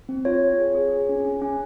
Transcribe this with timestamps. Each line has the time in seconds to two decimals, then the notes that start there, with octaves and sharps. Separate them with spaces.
0.09 C4
0.25 F4 C#5
0.42 F4
0.58 G#4
0.75 G#4
0.92 G#4
1.09 C#4
1.25 C#4
1.42 C#4